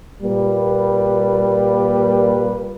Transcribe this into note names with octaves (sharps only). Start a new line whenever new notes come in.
A#2 G3 A#3 B4